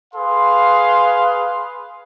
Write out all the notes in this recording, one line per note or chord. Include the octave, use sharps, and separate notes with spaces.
G#4 B4 F5 C6